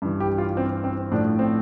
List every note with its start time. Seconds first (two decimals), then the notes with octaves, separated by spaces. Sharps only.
0.02 G2 E3
0.20 G4
0.38 F4
0.57 C4
0.84 C4
1.12 A2 F3 D4
1.39 C4